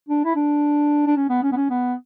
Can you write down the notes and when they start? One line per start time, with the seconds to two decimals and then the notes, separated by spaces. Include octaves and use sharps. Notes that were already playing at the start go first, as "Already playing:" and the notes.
0.09 D4
0.25 E4
0.35 D4
1.06 D4
1.16 C#4
1.29 B3
1.43 C#4
1.52 B3
1.56 C#4
1.70 B3